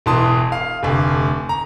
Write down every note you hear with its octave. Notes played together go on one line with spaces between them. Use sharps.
E1 E3 A5 C6 D#6
F5
F1 D2
A#5